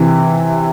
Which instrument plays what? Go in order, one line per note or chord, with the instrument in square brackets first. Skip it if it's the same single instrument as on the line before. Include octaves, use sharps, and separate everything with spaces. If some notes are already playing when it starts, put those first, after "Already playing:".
Already playing: [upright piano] C3 E3